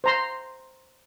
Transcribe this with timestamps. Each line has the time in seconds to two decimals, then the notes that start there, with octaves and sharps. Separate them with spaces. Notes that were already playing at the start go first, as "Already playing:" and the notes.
0.04 C5 A#5 C6